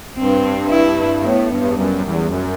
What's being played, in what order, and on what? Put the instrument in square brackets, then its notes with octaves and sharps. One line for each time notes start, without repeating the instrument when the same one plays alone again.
[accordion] G2 [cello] C4
[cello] E4
[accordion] A2 [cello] B3
[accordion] G2
E2
[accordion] F#2 [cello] G3
[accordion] E2
F#2